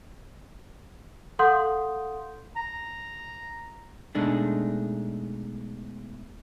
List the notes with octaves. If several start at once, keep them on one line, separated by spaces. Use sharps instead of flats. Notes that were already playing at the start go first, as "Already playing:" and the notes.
A4 F5 F#5 C6 D#6 G6
A#5
B2 G#3 A3 D4 D#4